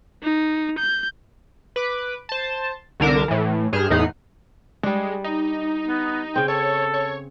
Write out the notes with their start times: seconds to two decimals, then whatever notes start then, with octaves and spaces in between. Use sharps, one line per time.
0.24 D#4
0.79 G6
1.76 B4 D6
2.29 C5 A5
3.00 C2 D3 A#4 D6 E7
3.28 A2 E3
3.73 G2 G#4 F6 G6 E7
3.90 E2 A2 D#4 F#5 B5 C7
4.83 G3 G#3 D4
5.24 D#4
5.88 B3
6.36 C#3 C4 G5
6.48 A4 C#5
6.94 C#5